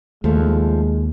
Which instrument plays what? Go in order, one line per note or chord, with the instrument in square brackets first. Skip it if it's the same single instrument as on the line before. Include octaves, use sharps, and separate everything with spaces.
[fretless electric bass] D#2 [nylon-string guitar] F3 A3 [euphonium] G#3